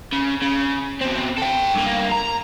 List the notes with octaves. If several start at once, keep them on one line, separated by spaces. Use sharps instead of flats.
C#3
C#3
B2 C4
A4 G5
G2 A#3
A#5